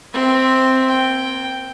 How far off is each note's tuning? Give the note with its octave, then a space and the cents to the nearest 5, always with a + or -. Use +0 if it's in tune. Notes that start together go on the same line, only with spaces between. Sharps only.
C4 +0 E5 +0
A#3 +40 G5 +0